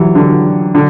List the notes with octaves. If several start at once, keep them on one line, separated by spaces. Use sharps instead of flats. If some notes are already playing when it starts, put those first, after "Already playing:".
Already playing: E3 F#3 G3
D3
D3